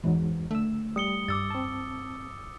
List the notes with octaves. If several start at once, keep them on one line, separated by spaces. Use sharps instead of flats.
E2 G#2 E3 F#3
D3 A3 E6
G3 D#6 C#7 G7
G2 D6 E6 A6
C4 A5